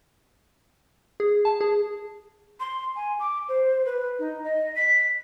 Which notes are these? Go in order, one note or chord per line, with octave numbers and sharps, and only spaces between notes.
G#4
A5
G#4
C6
G#5
D6
C5
B4
D#4
D#5
B6